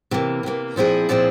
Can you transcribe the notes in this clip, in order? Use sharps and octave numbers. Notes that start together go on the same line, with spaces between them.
C3 E3 A#3
C3 E3 A#3
A#2 F3 C4 E4 G#4
A#2 F3 C4 E4 G#4